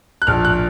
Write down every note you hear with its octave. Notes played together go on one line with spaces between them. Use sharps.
F#6
A#1 F6
F#6